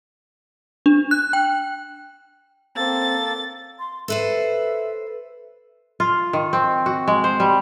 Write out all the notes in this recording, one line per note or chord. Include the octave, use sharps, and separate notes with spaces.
D4
F#6
G5
A#3 C4 A4 A6
C6
A4 B4 C5 E5
F4
D#3
C4
F#4
G#3
C5
G3